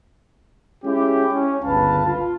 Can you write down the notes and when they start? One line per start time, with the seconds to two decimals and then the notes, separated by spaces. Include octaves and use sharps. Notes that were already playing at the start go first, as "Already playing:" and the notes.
0.84 G#3 C#4 E4 G4
1.32 C#4
1.63 G1 C#2 B4 F5 A5
2.06 F4